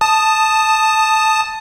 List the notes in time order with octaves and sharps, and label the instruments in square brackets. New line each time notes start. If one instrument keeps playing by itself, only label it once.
[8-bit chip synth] A5 D#6